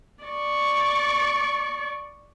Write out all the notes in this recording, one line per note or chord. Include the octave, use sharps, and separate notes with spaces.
D5 C#6